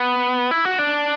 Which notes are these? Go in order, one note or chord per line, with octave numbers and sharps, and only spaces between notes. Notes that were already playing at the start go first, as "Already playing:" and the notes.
Already playing: B3
E4
F#4
D4